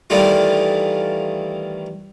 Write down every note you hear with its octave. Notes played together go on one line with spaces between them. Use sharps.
D#3 E3 G3 A3 F4